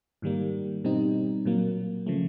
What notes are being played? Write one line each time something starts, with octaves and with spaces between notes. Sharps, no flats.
G#2 D#3 G3 A#3
B2 G3 C4 D#4
A#2 F#3 A#3
C#3 F3 A3